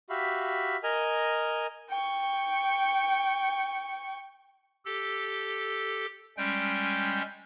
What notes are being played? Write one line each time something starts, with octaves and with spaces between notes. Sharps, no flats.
F#4 G4 E5 F5 B5
A#4 D#5 G#5 F6
G5 C#6
G4 A4
G3 G#3 C#4 G5 G6